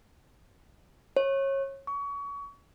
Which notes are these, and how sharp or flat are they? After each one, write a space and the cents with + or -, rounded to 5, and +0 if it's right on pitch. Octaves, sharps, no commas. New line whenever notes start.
C#5 -25
C#6 +30